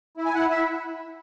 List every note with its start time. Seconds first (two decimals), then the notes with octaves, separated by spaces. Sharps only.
0.17 E4
0.25 G#5
0.33 E4 F#5
0.50 E4 E5